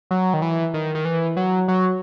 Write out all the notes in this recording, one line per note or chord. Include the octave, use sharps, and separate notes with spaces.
F#3
D#3
E3
D#3
D#3
E3
F#3
F#3